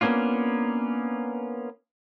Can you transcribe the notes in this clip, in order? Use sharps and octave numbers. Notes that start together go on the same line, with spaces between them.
A#3 B3 C#4 D4 F4